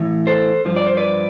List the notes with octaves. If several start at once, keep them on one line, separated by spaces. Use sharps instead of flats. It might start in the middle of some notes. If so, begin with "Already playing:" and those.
Already playing: A2 E3
A4 C5
G2 F3
D5
C5
B4 D5